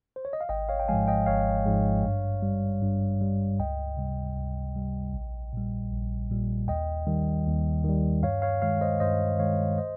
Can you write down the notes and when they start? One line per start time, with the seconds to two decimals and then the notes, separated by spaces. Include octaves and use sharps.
0.16 C5
0.25 C#5
0.33 D#5
0.41 F5
0.49 G#1 D#5 G5
0.69 C#5 F5
0.80 G5
0.88 G#2 F3 G#3 F5 G#5
1.08 D#5 G5
1.26 G#1 C#5 F5
1.66 G#2 F3 G#3
2.05 G2
2.42 G3
2.82 G2
3.21 G3
3.60 C#2 D#5 G5
3.97 C3 G3
4.37 C#2
4.76 C3 G3
5.14 A#1
5.53 A#2 G3
5.92 A#1
6.30 A#2 G3
6.68 D#2 D#5 G5
7.07 D#3 G3
7.46 D#2
7.84 D#3
7.89 G3
8.23 G2 C#5 F5
8.42 C#5 F5
8.62 D#3 G#3 C#5 F5
8.81 C5 D#5
9.00 G2 C5 D#5
9.39 D#3 G#3 C#5 F5
9.78 C5 D#5